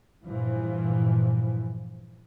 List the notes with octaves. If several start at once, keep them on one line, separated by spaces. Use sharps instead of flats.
G2 A#2 E3 F3